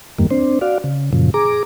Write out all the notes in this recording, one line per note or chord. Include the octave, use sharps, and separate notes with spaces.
E2 G2 D#3 G3 A#3
C4 D4 C5
F#4 D5 F5
C#3
F#2 A#2 C#3 F3
G#4 A#5 D6